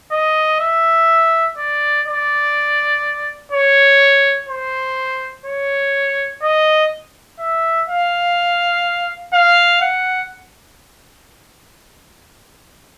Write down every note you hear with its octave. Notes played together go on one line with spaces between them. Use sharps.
D#5
E5
D5
D5
C#5
C5
C#5
D#5
E5
F5
F5
F#5